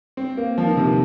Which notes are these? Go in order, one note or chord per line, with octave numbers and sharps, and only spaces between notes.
C4
A#3
F3
D#3
C3
D#3